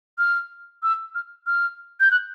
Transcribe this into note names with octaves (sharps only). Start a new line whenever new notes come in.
F6
E6
F6
F6
G6
F#6